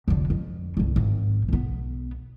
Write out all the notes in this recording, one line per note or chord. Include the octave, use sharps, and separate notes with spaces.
F1 D3
F2
G1 C2
G#1
B1 B3